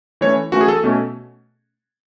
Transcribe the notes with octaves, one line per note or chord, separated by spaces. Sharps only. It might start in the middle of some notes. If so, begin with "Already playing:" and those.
E3 A3 C#4 C#5
E3 A3 C#4 F#4
G#4
A4
B2 A3 C#4